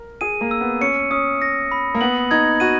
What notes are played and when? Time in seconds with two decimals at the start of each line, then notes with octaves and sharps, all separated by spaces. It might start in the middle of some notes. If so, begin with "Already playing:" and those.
Already playing: A#4
0.21 G#4 D#7
0.41 A#3
0.51 E6
0.61 B3
0.81 C#4 C#7
1.11 C#4 D#6
1.42 A#6
1.72 B5
1.95 A#3
2.01 B3 F#7
2.31 D#4 G#6
2.60 F#4 D#7